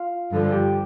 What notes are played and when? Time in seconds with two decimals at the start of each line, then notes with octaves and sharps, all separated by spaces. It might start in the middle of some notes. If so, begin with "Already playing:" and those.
Already playing: F4 F5
0.31 G2 D3 F3
0.52 G4 G5